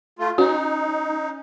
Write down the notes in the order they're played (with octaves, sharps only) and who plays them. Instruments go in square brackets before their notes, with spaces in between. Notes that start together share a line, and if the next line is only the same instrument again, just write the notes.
[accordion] A3 F4
[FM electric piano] C#4 [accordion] D#4 [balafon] F#4